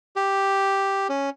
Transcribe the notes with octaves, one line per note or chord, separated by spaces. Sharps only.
G4
C#4